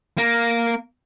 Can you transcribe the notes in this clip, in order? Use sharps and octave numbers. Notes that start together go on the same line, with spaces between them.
A#3